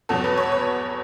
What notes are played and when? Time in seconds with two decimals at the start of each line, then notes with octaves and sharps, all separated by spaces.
0.09 E2 B2 F#3 A4
0.24 B4
0.37 C#5
0.52 C#5